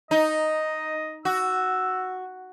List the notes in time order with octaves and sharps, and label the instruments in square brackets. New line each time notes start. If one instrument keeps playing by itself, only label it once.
[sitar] D#4 [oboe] D#5
[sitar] F#4 [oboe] E6